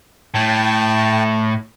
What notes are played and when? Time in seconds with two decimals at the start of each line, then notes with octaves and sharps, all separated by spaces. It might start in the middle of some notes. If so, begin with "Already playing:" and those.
0.34 A2 G5 A5